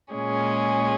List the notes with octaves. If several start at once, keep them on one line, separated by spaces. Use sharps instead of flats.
A#2 G#3 C#4 G#4